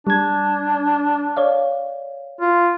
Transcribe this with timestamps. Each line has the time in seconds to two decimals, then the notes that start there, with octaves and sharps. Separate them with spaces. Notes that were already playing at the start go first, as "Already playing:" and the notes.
0.07 G3 D4 G#6
1.37 C#5 D5 F5
2.41 F4